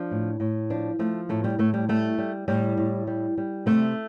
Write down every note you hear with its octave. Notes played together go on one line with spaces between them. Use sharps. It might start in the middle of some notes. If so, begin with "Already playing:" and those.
Already playing: F3 D4
A2
A2
F3 D4
F3 A3
A2 A3
G3
A2 A3
G3
G3 A3
G3
A2 G3
A2
G3
G3
C3 A3